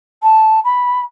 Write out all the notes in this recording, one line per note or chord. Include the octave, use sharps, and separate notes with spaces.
A5
B5